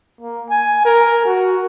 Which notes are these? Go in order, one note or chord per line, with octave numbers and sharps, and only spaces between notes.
A#3
G#5
A#4
F#4